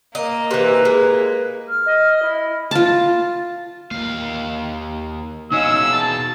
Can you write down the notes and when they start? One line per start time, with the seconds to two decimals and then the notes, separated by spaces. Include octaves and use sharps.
0.15 A#3 D#5
0.51 C3 E3 B4
0.85 G#3
1.69 F6
1.85 D#5
2.22 E4
2.71 F4 A5
3.91 D#2 A#3 F5
5.52 B2 C#4 D#4 G#4 D#5 F5 E6
5.93 A5